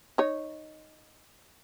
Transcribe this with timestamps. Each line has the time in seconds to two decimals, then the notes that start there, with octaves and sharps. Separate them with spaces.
0.18 D#4 C#5